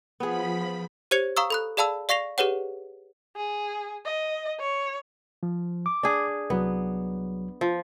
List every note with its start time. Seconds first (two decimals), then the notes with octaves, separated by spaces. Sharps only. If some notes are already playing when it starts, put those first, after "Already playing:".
0.20 F3 B3 G#4 B5
1.11 G4 C5 C#5 G#6 C#7 F7
1.37 F5 A#5 C#6 D#6 E6
1.50 A4 B5 F#6
1.77 G#4 D5 F5 A5 B5 E6
2.09 D5 F5 C#6 A#6 C7 F7
2.38 G4 G#4 B4 C#5 F#5
3.37 G#4
4.05 D#5
4.60 C#5
5.43 F3
5.86 D6
6.03 D4 G#4
6.50 C2 F#3 B3
7.61 F3